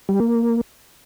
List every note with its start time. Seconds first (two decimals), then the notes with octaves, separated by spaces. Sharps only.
0.09 G3
0.20 A#3